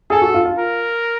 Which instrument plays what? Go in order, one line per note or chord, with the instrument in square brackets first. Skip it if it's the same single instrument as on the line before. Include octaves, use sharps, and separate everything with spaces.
[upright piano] G#4 [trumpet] A4
[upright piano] F#4
F4
F4
[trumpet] A#4